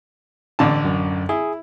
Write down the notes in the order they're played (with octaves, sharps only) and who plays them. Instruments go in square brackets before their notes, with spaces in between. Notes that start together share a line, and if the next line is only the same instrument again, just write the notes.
[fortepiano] A1 D3 A5
[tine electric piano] F#2
[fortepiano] E4 [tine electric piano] G#4